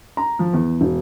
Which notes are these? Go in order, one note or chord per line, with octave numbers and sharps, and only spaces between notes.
A#5
F3
E2
E1